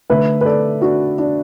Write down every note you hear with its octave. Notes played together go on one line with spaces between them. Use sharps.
D3 A3 B4 E5
B4
A4 D5
D4 F#4
D4